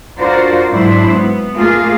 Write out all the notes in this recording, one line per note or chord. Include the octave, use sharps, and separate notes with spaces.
D4 F4 F#4 A#4 C5 D5
G#2 F#3 D4 E4 C5
B3
A3 A#3 F4 G#4